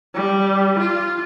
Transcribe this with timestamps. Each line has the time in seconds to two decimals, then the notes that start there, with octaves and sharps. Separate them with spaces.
0.15 G3
0.79 F4